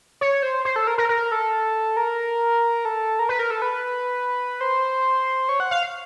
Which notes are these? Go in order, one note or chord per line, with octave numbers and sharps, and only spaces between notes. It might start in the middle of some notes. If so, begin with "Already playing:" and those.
C#5
C5
C5
A4
A#4
A#4
A#4
A4
A#4
A4
A#4
B4
A#4
A4
B4
C5
C#5
F#5
F5